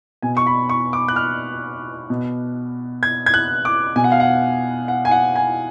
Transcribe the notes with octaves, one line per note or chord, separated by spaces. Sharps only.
B2 G#5
C#6
B5
C#6
D6
F#6
F6
B2
G#6
G#6
F#6
D6
B2 G#5
F#5
F5
F#5
F#5
G#5
F#5
G#5